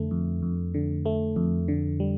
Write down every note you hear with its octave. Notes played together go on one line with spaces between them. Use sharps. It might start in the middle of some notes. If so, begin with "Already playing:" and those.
Already playing: F2 D3 A3
F2
F2
D3
A3
F2
D3
G3